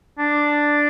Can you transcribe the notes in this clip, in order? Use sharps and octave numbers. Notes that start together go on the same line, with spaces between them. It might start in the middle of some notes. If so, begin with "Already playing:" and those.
D4